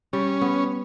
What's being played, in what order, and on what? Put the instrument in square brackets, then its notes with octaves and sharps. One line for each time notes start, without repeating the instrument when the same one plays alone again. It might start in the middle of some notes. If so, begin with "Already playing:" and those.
[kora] G3 [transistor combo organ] C#4
[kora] B3